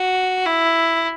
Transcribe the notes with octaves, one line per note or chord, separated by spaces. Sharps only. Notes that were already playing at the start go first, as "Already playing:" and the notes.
Already playing: F#4
E4